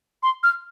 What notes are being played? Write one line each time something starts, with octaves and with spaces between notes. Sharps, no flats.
C6
F6